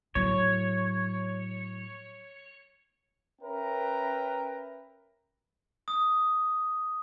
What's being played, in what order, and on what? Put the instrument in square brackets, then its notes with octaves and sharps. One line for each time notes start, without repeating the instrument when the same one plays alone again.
[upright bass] A2 F#3 [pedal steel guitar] C#5
[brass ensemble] C#4 A#4 B4 E5 G5 A#5
[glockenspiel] D#6